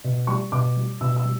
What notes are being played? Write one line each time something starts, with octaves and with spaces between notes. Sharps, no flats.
B2
G3 C#6
B2 D6
G3
B2 E6
E6
G3